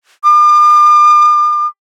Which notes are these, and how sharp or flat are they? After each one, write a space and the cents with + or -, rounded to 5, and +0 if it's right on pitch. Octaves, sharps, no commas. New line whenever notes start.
D6 +45